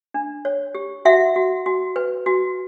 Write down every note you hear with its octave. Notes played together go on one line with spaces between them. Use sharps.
D4
C#5
G4
F#4 E5 F#5
F#4
F#4
B4
F#4